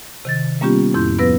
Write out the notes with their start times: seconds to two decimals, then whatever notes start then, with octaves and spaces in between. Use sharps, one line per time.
0.25 C3 D#3 A6
0.61 G3 A#3 B3 C#4 F4 G4
0.94 F2 A2 E4 C6 G6
1.19 D2 F3 B3 B4 E6 A#6